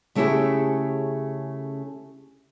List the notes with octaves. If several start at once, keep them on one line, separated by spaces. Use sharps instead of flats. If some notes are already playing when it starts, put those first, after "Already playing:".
C#3 A3 C#4 E4 G4 G#4